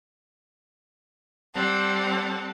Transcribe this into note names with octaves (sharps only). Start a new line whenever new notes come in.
G3 C4 A4 F#5